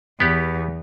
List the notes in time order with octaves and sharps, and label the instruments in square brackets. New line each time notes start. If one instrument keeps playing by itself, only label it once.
[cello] E2 [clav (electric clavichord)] B3 G4